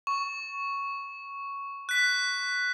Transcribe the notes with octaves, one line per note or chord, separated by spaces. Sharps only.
C#6
F#6 B6